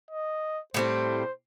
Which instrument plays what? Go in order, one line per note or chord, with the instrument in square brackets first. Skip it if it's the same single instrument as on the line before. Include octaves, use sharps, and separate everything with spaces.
[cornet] D#5
[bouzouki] A2 G3 C4 [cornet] C5